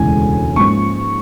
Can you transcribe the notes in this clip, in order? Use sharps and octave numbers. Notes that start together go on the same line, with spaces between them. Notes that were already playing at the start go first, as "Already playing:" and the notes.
Already playing: E1 D2 C#3 E3 G#3 G#5
G#2 F3 A#3 C#4 C#6